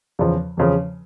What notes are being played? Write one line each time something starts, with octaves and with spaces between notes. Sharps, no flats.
E2 C#3 F3
E2 C#3 F3